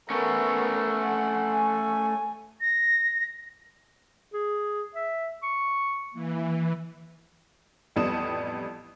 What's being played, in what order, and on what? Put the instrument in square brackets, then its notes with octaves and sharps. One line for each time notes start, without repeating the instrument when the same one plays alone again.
[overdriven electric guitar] A3 C#4 [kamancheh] B3 A#4
[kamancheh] F#5
G#5
[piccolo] A#6
[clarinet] G#4
E5
C#6
[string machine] E3 [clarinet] A#3
[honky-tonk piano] A1 F2 G3 B3 D#6 E7